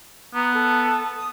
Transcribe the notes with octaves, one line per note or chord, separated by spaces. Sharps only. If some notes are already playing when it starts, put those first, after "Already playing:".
B3 A#5
A4
D#6